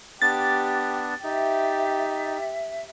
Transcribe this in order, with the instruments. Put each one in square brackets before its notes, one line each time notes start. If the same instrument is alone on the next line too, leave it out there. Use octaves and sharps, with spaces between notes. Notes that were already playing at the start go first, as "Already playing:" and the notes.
[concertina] B3 D4 [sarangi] G4 [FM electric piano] A6
[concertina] D#4 [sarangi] G4 [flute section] E5